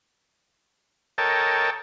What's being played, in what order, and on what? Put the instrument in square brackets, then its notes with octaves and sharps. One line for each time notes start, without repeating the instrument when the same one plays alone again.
[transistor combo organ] A4 A#4 C#5 D#5 G5 A5